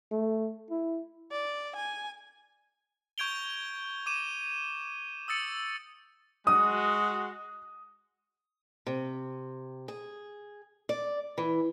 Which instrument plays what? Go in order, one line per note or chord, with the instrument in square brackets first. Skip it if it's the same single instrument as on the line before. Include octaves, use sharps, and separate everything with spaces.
[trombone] A3
E4
[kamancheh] D5
G#5
[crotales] C#6 G6 G#6 D7 F7 G7
D6 D#7 E7
D#6 E6 A6 C#7 D#7
[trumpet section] G#3 F#4 [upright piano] D#6
[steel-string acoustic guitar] C3
G#4
D5
E3